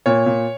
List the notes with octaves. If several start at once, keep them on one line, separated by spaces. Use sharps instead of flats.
A#2 C#5
A#2